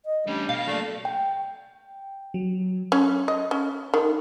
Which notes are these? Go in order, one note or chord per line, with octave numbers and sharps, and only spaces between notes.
D#5
G3 A3 C#4 D4
B2 F5
F#3 A3 A#3 D5
G5
F#3
C#4
D#5
C#4
D#3